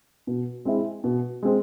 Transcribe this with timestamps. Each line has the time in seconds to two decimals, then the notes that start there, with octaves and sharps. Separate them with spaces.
0.27 B2
0.65 G#3 C4 E4
1.04 B2
1.43 G#3 C4